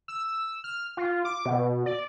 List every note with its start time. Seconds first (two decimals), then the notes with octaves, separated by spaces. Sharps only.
0.08 E6
0.64 F6
0.97 F4
1.25 D6
1.45 B2
1.86 D5